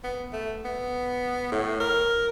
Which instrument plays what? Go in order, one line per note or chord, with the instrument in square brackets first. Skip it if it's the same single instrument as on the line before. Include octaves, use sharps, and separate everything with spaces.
[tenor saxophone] B3
A3
B3
A2
A#4